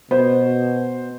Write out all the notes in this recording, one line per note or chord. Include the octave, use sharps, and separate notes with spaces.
B2 B3 C5